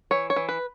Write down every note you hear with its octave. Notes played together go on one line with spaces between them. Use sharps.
E3 C#5
C#5
E3
B4